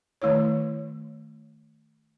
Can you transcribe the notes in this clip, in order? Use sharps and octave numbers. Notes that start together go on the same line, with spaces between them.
D#3 A3 E4 C#5